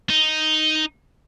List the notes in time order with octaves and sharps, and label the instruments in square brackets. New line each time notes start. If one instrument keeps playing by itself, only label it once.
[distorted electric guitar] D#4